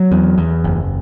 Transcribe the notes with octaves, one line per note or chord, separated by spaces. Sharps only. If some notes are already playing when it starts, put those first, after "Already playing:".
Already playing: F#3
E2
E2
F#1